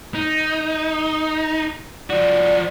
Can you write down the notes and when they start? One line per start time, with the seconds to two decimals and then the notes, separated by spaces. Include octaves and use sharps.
0.15 D#4
2.10 F3 F#4 D5